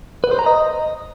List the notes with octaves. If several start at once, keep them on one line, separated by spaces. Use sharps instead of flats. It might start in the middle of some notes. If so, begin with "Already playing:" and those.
B4
C5
A#5
D#5